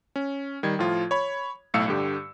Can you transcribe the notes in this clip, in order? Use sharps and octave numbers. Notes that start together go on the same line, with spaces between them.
C#4
D#3 G3 G#6
A2 F3 F4
C#5 B5
B1 A2 A3 F5 E6 C#7
G2 D3 G4